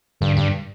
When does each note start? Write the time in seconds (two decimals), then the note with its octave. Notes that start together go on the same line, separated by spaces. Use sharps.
0.21 G2 D3
0.37 G2